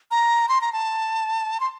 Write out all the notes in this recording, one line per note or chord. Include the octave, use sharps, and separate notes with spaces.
A#5
C6
A#5
A5
C6